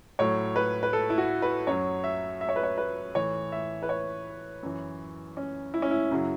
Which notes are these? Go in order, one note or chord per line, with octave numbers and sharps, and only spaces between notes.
A2 F#3 C#5
B4
B4
A4
E4
F#4
B4
F#2 F#3 C#5
E5
E5
C#5
B4
C#5
B4
A2 E3 C#5
E5
B4
C#5
F#2 E3
C#4
E4
C#4
E4
F#2 C#3 F#3